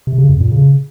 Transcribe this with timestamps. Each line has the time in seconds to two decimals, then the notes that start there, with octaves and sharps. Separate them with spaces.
0.07 C3
0.18 C#3
0.29 F2
0.41 A#2
0.52 C#3